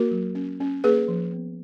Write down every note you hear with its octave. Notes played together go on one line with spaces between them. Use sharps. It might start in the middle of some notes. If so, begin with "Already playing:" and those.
Already playing: A#3 F#4 A#4
F#3
C#4
C#4
A#3 G#4 B4
F3
B3